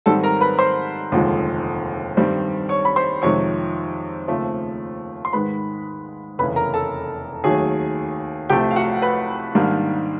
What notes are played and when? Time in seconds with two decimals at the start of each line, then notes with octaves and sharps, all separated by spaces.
0.06 G#2 D#3 G3 C4 A4 A5
0.23 A#4 A#5
0.41 B4 B5
0.59 C5 C6
1.11 F1 D#2 D3 F3 G#3
2.17 G2 D#3 G3 C4
2.69 C#5 C#6
2.85 B5
2.96 C5 C6
3.22 F2 C3 D#3 G#3 C#5 C#6
4.28 D#2 C#3 F3 A3 C4
5.25 C6
5.33 G#2 D#3 G#3 B4 B5
6.38 F1 E2 C#3 B4 B5
6.56 A#4 A#5
6.74 A4 A5
7.44 D#2 D#3 F#3 A3 G#4 G#5
8.50 C2 C3 F3 A3 G4 G5
8.71 F5
8.76 F#4 F#5
9.02 B4 B5
9.55 G#2 D#3 G3 A#3 D4